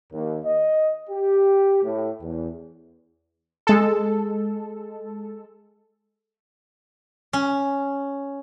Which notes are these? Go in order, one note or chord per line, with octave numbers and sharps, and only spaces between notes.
D#2
D#5
G4
A2
E2
G#3 A4
C#4